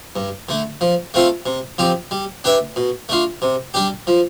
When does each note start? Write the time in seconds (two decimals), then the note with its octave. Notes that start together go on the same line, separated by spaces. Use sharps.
0.16 G2
0.49 D3 A3
0.81 F3
1.14 A3 C4 F4 A4
1.46 C3
1.78 F3 C4 G4
2.11 G3
2.44 D4 G4 B4 E5
2.76 B2
3.09 A3 D4 F4
3.42 C3
3.74 G3 D4 G4
4.07 F3